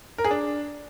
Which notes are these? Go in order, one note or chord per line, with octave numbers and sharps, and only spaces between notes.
A#4
G#4
D4